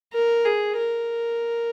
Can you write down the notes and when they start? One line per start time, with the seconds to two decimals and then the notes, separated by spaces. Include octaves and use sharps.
0.13 A#4
0.45 G#4
0.78 A#4